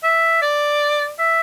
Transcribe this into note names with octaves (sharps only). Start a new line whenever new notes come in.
E5
D5
E5